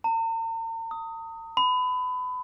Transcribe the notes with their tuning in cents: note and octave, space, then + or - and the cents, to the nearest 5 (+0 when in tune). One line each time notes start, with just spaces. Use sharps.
A#5 -45
D#6 +15
B5 +25